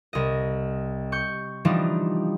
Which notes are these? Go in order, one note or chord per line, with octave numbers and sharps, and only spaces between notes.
C2 D#5
C#6 G6
E3 F3 G3 D4 D#4